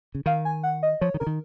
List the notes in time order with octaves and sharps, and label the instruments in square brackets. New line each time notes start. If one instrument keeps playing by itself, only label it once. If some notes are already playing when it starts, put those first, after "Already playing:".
[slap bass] C#3
[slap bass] D#3 [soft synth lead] F5
[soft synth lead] G#5
F#5
D#5
[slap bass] F3 [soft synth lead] C#5
[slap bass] D#3
[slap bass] C#3 [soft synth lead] A#4
[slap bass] D#3